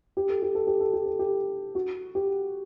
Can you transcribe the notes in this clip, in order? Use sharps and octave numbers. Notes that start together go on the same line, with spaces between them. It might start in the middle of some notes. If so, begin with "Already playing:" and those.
G4
A4
G4
A4
G4
A4
G4
A4
G4
F#4
G4